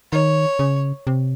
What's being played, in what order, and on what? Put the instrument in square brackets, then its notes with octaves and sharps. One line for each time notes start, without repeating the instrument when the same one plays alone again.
[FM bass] D#3 [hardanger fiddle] C#5
[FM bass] C#3
C3